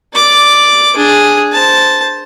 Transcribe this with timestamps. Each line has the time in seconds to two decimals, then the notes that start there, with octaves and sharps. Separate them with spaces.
0.15 D5 D6
0.96 D4 G#4
1.52 C5 A5